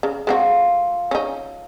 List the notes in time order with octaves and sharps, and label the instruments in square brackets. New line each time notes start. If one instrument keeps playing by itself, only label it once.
[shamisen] C#3
[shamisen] G#3 C4 F#4 [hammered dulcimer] F4 A4
[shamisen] C#4 D#4